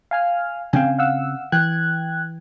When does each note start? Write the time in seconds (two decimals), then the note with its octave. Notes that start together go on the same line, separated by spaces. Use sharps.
0.11 F5 G#5 F6
0.73 C#3 C4 F5 G5 G#5
0.99 F5 F#5 E6
1.52 E3 G5 F#6 G#6